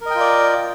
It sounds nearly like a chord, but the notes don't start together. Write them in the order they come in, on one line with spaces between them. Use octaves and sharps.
A#4 D#5 G5 F4 D5